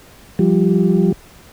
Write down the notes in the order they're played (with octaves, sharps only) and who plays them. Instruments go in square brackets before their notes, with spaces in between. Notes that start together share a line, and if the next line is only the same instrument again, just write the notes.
[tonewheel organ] F3 G3